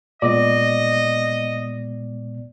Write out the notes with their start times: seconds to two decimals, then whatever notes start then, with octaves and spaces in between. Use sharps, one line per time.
0.22 A#2 G#3 B3 D5 D#5